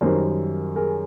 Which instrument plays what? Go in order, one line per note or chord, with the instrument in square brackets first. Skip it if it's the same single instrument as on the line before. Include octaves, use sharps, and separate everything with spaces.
[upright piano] F#2 D#3 G3 A#4 C5
G#4 A#4